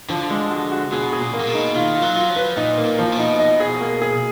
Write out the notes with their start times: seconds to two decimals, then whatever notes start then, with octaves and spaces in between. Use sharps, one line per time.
0.09 D3 F3
0.30 G#3
0.51 F#4
0.72 F#4
0.92 B2 G#4
1.13 G#4
1.20 A#2
1.34 A#3
1.40 A#2
1.47 B2
1.54 D#4
1.75 D#3 F4
1.95 F4
2.02 F#3
2.16 F4
2.30 F3
2.36 B4
2.57 A#2 D#4
2.78 A#3
2.85 A#2
2.99 F3
3.12 B2
3.19 D#4
3.39 D#5
3.60 G#4
3.81 A#3
4.02 G#4